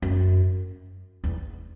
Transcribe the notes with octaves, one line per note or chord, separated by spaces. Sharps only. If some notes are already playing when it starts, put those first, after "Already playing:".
F#2
E2